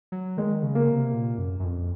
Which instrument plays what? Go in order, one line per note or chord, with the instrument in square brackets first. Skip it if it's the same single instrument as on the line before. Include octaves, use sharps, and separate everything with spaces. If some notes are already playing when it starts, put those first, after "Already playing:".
[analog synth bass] F#3
[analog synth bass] D#3 [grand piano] G#3
[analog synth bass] C#3
[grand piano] A#3
[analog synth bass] C3
A#2
F#2
F#2
F2